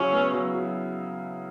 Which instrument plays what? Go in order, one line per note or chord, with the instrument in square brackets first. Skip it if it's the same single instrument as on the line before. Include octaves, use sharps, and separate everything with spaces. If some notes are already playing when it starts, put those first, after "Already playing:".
Already playing: [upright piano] C#3 F#3 E4 [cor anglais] C#4
[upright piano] B3
F#3
F#3